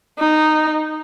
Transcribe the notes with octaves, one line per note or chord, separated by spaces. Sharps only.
D#4